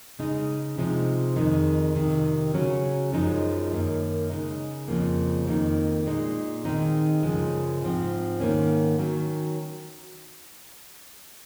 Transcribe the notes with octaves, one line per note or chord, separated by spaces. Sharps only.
C#3 G#3 D#4
C3 F3 G#3 D#4
F2 D#3 G#3 D#4
F2 C3 D#3
C#3 F#3 C#4
F#2 F3 G#3 D#4
F#2 D#3 A#3
C#3 G#3 D#4
F2 C#3 F3 A#3
F2 D#3 A#3 D#4
A#2 G#3 D#4
D#3 G#3 C4 D#4
F#2 C#3 F3 G#3
G#2 F3 C4
G#2 D#3 A#3 C#4
D#3 F#3 C#4